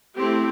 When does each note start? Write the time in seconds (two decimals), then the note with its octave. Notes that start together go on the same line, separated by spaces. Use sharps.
0.15 A3 C4 E4 G4